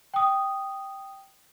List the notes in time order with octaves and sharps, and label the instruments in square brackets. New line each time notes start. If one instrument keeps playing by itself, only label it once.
[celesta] G5 D#6